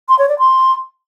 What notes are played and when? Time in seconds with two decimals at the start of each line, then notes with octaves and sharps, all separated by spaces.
0.09 C6
0.19 C#5
0.29 D5
0.39 C6